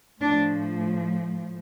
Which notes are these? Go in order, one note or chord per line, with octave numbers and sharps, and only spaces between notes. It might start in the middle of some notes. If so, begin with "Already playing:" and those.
A2 F3 D4